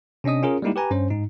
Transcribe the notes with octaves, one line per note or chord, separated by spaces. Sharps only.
C3 C#4 D4 D#5 D#6
C#4 F4 G#4 A#4
G3 G#3 A#3 D#4 E4 G4
G4 B4 G#5 A#5
G2 C#4 C5
G#2 D#4